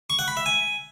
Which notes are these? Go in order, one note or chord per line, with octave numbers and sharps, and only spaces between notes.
C#6
F#5
B5
E5
G#5